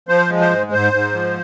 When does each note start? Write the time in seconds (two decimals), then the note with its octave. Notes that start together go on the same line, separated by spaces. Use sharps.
0.08 F3 C5
0.29 G#3
0.41 C5
0.51 G#2
0.72 G#2 C5
0.93 G#2
1.14 F3